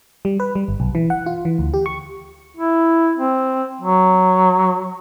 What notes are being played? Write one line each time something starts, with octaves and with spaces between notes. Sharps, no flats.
G3
B4
G3
G1
B1
E3
F#5
F4
E3
D2
G4
C#6
E4
C4
F#3